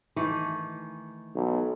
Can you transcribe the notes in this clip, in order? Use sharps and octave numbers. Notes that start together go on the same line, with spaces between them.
D#3 E3 A3
B1